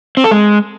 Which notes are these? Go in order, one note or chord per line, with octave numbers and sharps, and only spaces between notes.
C4
A4
G#3